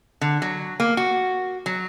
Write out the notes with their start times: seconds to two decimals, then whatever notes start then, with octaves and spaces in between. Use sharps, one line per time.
0.21 D3
0.42 F#3
0.80 A#3
0.97 F#4
1.66 F#3